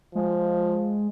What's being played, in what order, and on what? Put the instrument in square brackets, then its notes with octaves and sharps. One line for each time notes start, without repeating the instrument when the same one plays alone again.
[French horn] F3 [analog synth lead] G#3